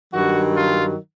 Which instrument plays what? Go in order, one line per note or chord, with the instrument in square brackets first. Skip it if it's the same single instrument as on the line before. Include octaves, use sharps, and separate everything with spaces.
[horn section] G2 D#3 F#3 F#4
F4